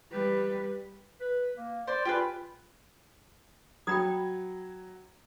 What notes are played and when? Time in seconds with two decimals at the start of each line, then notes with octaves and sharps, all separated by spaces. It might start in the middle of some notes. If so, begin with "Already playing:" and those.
0.11 G3 B4
1.21 B4
1.57 A#3
1.87 C5 D5
2.05 F4 G4 G#4 B4
3.87 F#3 G5 B5 D#6 G#6